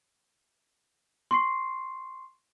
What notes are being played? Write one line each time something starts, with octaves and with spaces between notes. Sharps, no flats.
C6 C#6 C7